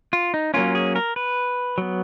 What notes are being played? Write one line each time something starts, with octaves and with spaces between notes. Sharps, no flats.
F4
D#4
F#3 A#3 C#4 F4
G#4
A#4
B4
F#3 B3